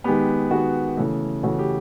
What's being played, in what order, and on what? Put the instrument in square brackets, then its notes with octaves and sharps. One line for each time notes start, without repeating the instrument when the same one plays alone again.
[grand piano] D#3 G#3 B3 G4
D#3 G#3 B3 F#4
C#3 E3 A3
C#3 E3 A3 F#4
G4